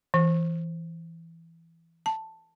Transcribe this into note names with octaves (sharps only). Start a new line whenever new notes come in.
E3
A5